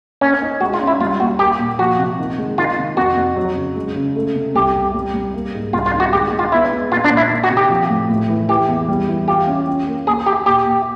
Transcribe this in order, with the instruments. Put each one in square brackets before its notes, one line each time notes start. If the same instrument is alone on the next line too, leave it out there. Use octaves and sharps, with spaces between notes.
[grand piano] A#3 [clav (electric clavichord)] C#4
[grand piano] D#4
[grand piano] G#3 [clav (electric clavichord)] F#4
[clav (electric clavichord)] F4
[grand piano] C#4
[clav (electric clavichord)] E4
[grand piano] G3 [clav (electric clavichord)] F4
[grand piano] D#2 [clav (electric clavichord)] F#4
[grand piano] A#3 [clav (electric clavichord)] G4
[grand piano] A#2
[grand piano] F3 [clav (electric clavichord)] F#4
[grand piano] C3
D#3
G#3
[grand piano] D#3 [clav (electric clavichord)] F4
[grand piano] C3
[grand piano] F2 [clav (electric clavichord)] F#4
[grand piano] F2
F#3
C#3
G#3
C#3
A3
C3
[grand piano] C2 [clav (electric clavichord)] G4
[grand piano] C2
G3
G3
A#3
G#2
[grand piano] C2 [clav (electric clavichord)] F4
[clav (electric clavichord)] F4
[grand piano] D#3
[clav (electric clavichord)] F#4
[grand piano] G#3 [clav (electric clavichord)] G4
[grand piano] G#3
[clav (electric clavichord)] F4
[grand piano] B3 [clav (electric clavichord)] E4
[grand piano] G#3
[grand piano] A#2 [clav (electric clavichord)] F4
[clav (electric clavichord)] D4
[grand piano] A#2
[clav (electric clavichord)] E4
[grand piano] D#3
[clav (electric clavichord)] F#4
[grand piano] C3
[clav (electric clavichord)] G4
[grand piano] F3
A2
A2
E3
[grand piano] E3 [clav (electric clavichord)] G4
[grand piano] E2
G3
E3
[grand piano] F4 [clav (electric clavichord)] G4
[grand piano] C#4
C#4
A#3
[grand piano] D#2 [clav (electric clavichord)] G#4
[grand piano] D#2 [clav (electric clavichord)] G4
[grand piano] A#2 [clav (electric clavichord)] G4
[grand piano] A#2